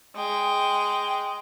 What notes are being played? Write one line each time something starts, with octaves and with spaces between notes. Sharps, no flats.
G#3 G5